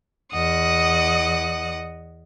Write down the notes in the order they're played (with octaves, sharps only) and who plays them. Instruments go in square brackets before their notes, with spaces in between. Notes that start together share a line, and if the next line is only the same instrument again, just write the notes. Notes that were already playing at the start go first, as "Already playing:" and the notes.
[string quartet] E2 D#5 F#5 D#6